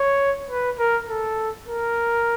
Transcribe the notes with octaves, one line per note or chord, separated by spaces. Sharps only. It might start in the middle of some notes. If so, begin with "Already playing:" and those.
Already playing: C#5
B4
A#4
A4
A#4